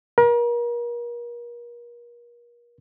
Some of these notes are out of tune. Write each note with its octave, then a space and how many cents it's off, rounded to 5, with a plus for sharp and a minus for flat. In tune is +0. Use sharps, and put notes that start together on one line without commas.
A#4 +40